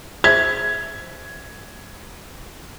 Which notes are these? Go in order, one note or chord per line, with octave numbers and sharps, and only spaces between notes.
G#4 C5 E5 G#6